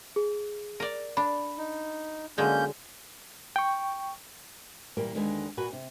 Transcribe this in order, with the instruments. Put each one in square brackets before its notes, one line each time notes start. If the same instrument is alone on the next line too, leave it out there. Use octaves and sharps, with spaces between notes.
[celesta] G#4
[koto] A#4 D5
[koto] D4 [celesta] B5
[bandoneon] D#4
[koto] D3 F#3 G#3 [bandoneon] A#3 C#4 G6
[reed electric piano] G5 C#6
[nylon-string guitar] A#2 E3 G3 A#3
D#2 D3 G#3 B4 G#5
A#2 F#4 B4 G#5
C3